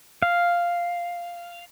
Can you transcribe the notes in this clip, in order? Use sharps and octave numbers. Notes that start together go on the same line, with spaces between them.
F5